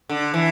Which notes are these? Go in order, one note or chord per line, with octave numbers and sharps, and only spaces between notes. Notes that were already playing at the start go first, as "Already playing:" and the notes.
D3
E3